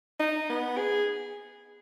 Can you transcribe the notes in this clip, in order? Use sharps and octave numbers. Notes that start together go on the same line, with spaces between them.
D#4
B3
G#4